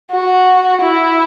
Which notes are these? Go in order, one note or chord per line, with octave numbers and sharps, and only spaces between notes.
F#4
E4